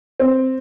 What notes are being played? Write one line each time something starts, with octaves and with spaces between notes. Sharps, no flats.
C4